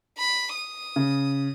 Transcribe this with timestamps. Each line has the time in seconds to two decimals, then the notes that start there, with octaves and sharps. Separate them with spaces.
0.19 B5
0.55 D#6
0.96 C#3